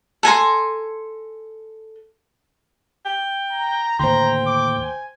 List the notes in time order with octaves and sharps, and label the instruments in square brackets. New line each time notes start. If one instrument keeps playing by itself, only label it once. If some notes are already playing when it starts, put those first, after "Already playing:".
[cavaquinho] A4 G#5 A#5 C6
[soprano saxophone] G5
[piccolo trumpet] A#5
[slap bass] D#2 A2 D3 [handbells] C5 C6 [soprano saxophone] G5 [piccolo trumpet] A#5
[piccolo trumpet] D6
G#5